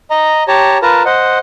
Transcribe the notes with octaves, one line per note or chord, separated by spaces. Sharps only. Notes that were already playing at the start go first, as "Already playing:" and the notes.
D#5 A#5
G4 C#5 A5 A#5
F4 A#4 B4 A5 A#5
C5 D#5 F#5